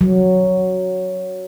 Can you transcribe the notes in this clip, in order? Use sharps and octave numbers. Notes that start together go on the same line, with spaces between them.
F#3